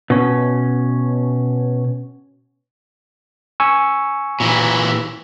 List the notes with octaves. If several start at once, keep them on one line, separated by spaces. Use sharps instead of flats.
B2 C#4
G#5 C#6 E6
A#2 E3